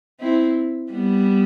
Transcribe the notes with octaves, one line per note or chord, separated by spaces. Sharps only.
C4 E4
G3 B3